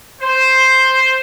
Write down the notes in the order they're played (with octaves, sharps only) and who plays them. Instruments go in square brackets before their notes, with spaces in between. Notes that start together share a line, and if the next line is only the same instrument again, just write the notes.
[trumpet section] C5